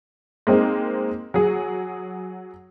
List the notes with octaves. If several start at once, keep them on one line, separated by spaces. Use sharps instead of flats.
G#3 A#3 C4 D#4
F#3 G#4